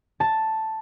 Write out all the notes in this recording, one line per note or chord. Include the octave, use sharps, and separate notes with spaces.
A5